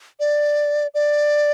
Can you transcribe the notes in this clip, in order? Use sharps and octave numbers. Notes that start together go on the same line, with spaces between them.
D5
D5